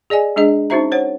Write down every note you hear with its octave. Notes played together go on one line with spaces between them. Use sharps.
G#4 D5 D#5 G#5
G#3 D4 G#4 D#5
C#4 D#4 F#4 C5 E5 A#5
C5 C#5 F#5